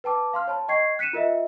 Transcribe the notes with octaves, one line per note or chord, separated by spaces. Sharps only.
B4 G5 A5 D6
F5 C6 F6
C#5 A5 B5
D#5 G5 C#6 G#6 C7
F#6 B6 C#7 D#7 E7
F4 A#4 D#5 E5